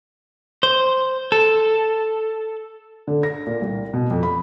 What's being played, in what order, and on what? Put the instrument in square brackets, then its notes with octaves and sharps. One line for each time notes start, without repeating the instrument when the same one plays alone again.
[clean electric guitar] C5
A4
[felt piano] D3
A#6
A#2
C2
B2
F2
B5